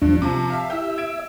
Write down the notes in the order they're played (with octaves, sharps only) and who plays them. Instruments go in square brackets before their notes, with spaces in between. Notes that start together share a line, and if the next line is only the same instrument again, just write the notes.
[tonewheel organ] E2 F3 D4 [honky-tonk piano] G2
[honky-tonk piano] C3 F3 [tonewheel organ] A5
[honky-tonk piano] E5 F5
[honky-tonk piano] E4 G4 [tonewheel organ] E5 E6
[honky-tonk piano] G#6 D7 E7